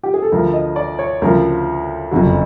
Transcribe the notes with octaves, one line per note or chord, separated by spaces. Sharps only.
G4
G#4
A4
D2 D3 F3 A#4
D#5
D5
C#5
D2 C#3 F3 A#4
F#1 F2 D3 F#3